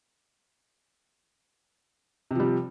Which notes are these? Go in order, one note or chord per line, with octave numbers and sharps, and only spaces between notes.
C3 F3 G3